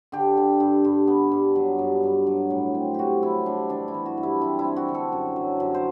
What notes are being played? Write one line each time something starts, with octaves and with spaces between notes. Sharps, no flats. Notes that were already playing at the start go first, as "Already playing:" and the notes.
D3 G4
D3
G2
G2
B3
G2
F#3
G2
G2
F#3
A2
C4
C3 F#4 G4
F#3 E4
C3 D4
E3 D4
E4
E3
F#4
G2
E4
C4 E4
E4
C4
F#4
D3
A4
F#2
F#3
F#2
C5